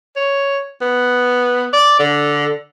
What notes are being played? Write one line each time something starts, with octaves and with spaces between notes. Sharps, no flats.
C#5
B3
D5
D3